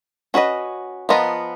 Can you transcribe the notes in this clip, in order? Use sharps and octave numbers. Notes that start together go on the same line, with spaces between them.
C#4 F#4 B4 D#5
F3 B3 F4 A#4 D#5